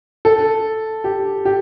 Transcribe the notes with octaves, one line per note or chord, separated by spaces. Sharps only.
A4
G4
G4